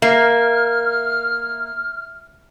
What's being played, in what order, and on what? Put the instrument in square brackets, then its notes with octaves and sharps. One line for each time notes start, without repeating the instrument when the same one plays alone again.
[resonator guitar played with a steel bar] A#3 [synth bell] E5 [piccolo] F6